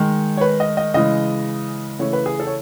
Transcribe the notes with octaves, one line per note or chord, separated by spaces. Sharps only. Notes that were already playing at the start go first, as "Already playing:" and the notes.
Already playing: D#3 G#3
C#5
B4
D#5
D#5
C#3 E3 G#3 D#5
C#3 E3 A3 C#5
B4
G#4
A4
C#5